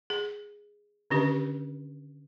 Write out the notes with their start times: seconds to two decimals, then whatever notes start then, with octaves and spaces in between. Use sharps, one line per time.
0.10 G#4
1.11 D3 D#3 C#4 D4 G4 B4